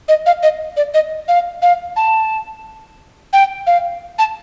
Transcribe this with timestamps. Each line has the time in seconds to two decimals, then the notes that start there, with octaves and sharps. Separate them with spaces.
0.09 D#5
0.26 F5
0.43 D#5
0.77 D5
0.94 D#5
1.28 F5
1.62 F5
1.96 A5
3.33 G5
3.67 F5
4.19 A5